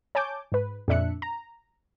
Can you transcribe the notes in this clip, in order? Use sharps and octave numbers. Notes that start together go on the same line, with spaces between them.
C#5 G#5 A5 D6 G6
G#2 B4
F2 A#2 D4 E5 F#6 C#7
A#5